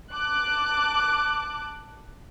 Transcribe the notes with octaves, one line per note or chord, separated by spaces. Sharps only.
A5 D6 F#6